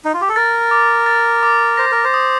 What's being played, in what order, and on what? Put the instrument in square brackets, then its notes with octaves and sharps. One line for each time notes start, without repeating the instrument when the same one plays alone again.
[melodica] D#4
F4
G4
A4
[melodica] A#4 [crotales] A6
[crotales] D6
A6
D6
[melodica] C5 [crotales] A#6
[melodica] A#4
C5
[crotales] D#6